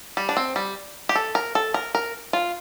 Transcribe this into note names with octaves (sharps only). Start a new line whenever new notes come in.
G3
D4
C4
G3
G4
A4
A#4
A4
A#4
A#4
F4